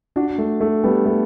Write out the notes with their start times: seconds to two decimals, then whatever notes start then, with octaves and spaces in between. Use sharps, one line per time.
0.16 D4 F#4
0.38 A3
0.61 A3
0.84 G3 B3
1.06 A3